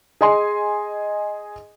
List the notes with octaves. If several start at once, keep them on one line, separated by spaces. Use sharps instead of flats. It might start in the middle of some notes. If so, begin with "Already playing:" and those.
G#4 D#5 G#5 C6